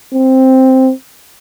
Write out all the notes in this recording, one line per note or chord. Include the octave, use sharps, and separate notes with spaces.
C4